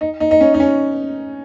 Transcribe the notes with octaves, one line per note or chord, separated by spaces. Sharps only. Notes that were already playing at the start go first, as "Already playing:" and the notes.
D#4
D#4
D#4
C#4
D#4
C#4